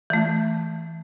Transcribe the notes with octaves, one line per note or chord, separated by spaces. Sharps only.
E3 A3